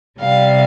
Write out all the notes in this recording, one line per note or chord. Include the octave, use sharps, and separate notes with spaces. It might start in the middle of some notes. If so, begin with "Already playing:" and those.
C3 G3 F5